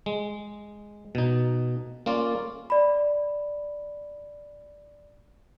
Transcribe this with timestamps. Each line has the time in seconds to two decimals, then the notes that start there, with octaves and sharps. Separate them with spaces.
0.06 G#3
1.15 B2 D#4
2.06 A#3 C#4 F4 D5
2.70 D5 B5